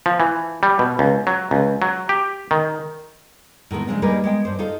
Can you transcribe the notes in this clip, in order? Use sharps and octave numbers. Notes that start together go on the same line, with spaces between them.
F3
E3
G3
B2
C#2
F#3
C#2
F#3
G4
D#3
A2 D#3 G#3 B3
C#3 F3 G#3 C4 D4
G3 A#3 D#4 G#4 A#4 B4
G#3 B3 G5
G2 C5
D#4 F4 A4